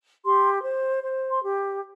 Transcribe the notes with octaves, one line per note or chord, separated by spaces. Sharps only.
G4 C6
C5
C5
C6
G4